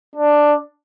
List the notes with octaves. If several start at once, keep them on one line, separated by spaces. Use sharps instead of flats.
D4